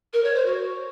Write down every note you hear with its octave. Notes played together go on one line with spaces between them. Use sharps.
A#4
C#5
C5
F#4